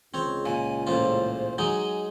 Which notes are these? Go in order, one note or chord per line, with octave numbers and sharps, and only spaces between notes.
C#2 C4 C#5
A#2 G#5
A1 A#2 F4 C5
F#3 G#3 D#4 G#5